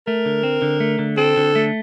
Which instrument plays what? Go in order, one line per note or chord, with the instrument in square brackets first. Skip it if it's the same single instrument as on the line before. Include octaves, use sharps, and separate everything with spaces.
[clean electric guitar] A3 [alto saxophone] A#4
[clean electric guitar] D3
C4
D3
A3
D3
[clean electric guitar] C4 [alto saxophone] A4
[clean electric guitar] D3
A3